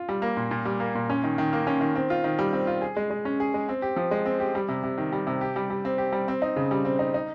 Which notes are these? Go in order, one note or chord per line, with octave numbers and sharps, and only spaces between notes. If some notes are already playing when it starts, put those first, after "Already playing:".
Already playing: F4
G3
A#3
A#2
A#2
G3
A#3
A#2
C#4
D#3
D#3
A#3
C#4
D#3
C4
F4
D#3
G3
C4
F4
G#4
G#3
G#3
C#4
G#4
G#3
C4
G4
F3
G#3
C4
G4
G3
C3
C3
D#3
G3
C3
G4
G3
G3
C4
G4
G3
C4
D#4
C#3
G3
C4
D#4
D#4